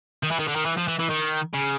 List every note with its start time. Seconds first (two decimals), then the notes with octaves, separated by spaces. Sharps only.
0.23 D#3
0.31 E3
0.40 D#3
0.48 D3
0.56 D#3
0.66 E3
0.77 F3
0.88 E3
0.99 E3
1.10 D#3
1.54 C#3